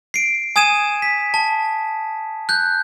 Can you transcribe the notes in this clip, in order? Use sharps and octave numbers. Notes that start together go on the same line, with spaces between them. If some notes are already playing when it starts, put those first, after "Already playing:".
C7 D7
G#5 D#6 G#6 D#7 E7
B6
A5
F#6 G6